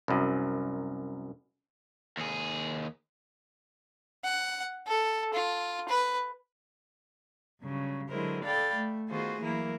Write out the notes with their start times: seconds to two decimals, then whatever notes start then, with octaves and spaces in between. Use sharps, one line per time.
0.08 C2 F#2
2.17 D#2 G#4
4.24 F#5
4.87 A4
5.34 F4
5.89 B4
7.61 G2 C#3 F#3
8.09 D3 F#3 G#3 E4 A#4 C5
8.44 A4 D5 F5 G5 B5 A6
8.75 A3
9.10 D#3 B3 F4 F#4 G#4 C5
9.41 E3 F#3 A#3 E4 A#4